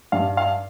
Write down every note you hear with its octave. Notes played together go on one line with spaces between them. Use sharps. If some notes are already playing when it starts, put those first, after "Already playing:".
G2 F5
F5